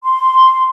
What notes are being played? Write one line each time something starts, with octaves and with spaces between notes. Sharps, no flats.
C6